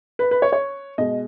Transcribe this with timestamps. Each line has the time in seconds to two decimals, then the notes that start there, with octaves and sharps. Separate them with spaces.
0.19 B4
0.31 B4
0.42 C#5
0.52 C#5
0.98 B2 G#3 D#5